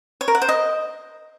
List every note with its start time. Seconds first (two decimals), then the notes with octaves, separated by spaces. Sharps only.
0.21 C#5
0.28 A#4
0.35 F#5
0.42 C5
0.49 D#5